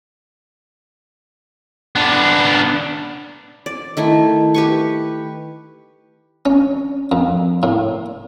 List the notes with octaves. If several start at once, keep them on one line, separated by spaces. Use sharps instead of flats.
B3 D4
D5
D#3 A3 E4
G4 B4 C#6
C#4
F2
A2